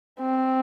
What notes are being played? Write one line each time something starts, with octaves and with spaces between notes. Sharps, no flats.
C4